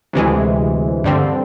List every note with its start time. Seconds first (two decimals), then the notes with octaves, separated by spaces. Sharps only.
0.13 D2 C3 E3 G#3
1.04 G2 D3 G3 C4